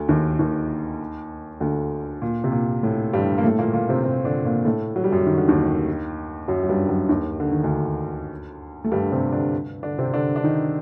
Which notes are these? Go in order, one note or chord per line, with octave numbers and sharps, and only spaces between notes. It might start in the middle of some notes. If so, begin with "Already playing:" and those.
Already playing: D2 D3
D#2 D#3
D#2 D#3
D2 D3
A#2
C3
A#2
A2
G2 G3
A#3
A2 A3
A#2 A#3
A#2 A#3
C3 C4
C3 C4
D3 D4
A#2 A#3
A2 A3
F#3
G3
F#2 F#3
D#3
D3
D#2 D#3
F#2 F#3
F#3
G2 G3
F#2 F#3
D#2 D#3
D3
D#3
D2 D3
A3
G2 G3
C3 C4
D3 D4
D3 D4
C3 C4
D3 D4
D4
D#3 D#4